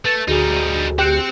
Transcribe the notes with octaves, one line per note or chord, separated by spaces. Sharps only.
A3 B4 A6
D2 G3 D#4 F#4 G#4 G#5
C4 G4 F#6 C#7